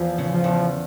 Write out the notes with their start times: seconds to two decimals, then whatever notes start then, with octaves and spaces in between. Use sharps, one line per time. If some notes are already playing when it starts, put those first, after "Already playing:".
Already playing: E2 F3
0.18 C#3
0.32 F3
0.44 E2